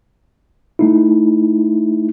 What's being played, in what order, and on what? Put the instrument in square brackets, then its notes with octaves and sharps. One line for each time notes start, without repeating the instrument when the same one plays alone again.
[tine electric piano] A3 D#4 E4